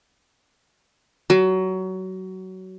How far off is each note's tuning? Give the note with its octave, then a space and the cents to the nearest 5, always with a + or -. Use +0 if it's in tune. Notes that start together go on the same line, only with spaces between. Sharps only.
F#3 +20